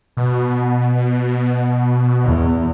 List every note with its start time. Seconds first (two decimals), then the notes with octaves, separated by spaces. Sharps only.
0.17 B2
2.25 E2